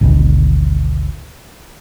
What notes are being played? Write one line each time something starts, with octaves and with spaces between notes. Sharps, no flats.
G#1 D2 B2